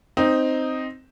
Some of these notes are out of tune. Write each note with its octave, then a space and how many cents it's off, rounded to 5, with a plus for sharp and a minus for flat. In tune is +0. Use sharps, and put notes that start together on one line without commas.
C4 +0 D#4 +0